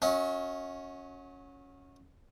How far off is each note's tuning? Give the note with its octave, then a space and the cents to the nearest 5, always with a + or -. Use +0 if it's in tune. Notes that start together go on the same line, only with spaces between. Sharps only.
C#4 +0 F#4 -25 D#5 +45